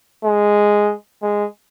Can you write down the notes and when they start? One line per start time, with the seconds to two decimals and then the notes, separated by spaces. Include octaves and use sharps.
0.25 G#3
1.23 G#3